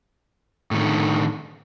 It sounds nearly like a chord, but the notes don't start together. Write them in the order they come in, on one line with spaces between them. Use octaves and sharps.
A2 D#3 D3